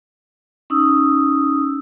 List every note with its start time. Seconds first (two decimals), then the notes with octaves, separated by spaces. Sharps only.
0.70 C#4 D#4 D#6 E6